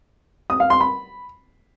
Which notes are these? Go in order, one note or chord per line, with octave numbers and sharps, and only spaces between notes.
D#6
F5
C6
B5